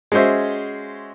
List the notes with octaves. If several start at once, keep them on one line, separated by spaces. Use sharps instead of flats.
G#3 C#4 F#4 C5 E5